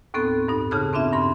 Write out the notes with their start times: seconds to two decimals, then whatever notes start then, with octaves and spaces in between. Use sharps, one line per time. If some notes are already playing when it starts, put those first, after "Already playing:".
0.14 D#2 A2 B3 C4 A4 F#6
0.48 G2 D#4
0.71 C#3 D#4 G#4 A5 F6 F#6
0.93 B3 C4 D4 F4 E5
1.12 G2 C6